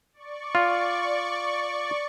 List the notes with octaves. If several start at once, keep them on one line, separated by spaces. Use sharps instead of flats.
D5 C#6
F4